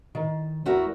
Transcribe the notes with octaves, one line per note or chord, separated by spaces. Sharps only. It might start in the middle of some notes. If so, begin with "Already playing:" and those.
D#3
E2 A3 F#4 A#4 E5